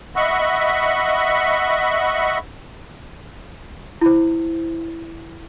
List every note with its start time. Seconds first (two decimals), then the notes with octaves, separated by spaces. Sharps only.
0.16 D#5 E5 F#5 B5 C#6
4.01 E4 C5